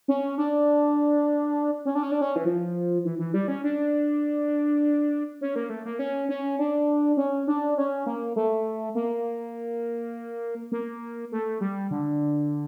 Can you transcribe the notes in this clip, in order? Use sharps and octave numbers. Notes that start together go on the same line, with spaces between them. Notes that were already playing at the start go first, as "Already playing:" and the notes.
C#4
D4
C#4
D4
C#4
D4
C#4
E3
F3
E3
E3
G3
C#4
D4
C#4
A#3
A3
A#3
C#4
C#4
D4
C#4
D4
C#4
A#3
A3
A#3
A#3
A3
G3
D3